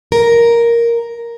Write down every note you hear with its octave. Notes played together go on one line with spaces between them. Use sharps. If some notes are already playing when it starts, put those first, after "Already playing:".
A#4